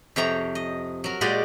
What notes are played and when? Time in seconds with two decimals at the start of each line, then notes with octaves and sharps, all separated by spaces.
0.16 F2 C3 C#5 F#5 G5 A#5
0.55 D#5
1.04 F#3 A#4
1.21 A#2 G#3 F#4 G4 D5 D#5